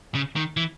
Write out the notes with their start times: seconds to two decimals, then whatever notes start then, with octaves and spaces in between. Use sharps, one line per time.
0.15 C#3
0.36 D#3
0.57 E3